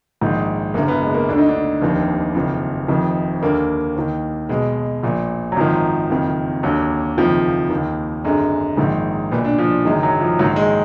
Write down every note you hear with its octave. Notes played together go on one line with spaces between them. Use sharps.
A#1 G#2 D#3
F#1 F#2 D3 A#3
B3
G#3
A#3
D2 D3 D4
D#4
D4
F1 D#2 D#3
F#1 F2 D#3
F1 F2 D#3
D#2 D3 A#3
D#2 D#3
B1 B2 G#3
A#1 A#2
F#3
G#1 F#2 D#3 F3
F#1 F2 D#3
D#2 D3 F#3
F#1 F2 D#3 F3
D#3
D#2
G#1 F#2 D3 G#3
A#1 G#2 D#3
B1 A#2 B3
D4
F3
F#1 F#2 D#3 G#3
F#3
F3
A#1 G#2 D#3 F#3
G#3